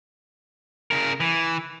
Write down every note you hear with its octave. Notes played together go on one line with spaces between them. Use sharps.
C#3 A#4
E3